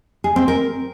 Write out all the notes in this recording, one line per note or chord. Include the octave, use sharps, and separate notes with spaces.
G#4
C4
A#4